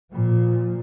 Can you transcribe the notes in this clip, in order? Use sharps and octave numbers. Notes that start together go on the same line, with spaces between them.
A#2 F3